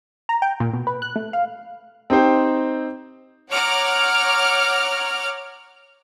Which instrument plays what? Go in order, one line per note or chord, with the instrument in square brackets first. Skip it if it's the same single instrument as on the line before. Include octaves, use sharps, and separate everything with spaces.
[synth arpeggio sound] A#5
G5
A#2
B2
B4
F#6
A3
F5
[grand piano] C4 D#4 G4 C5 G5
[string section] C#5 F#5 A#5 D6 F6